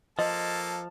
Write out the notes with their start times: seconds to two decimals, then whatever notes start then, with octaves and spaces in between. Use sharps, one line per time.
0.19 F3 A#3 A4 D#5 A5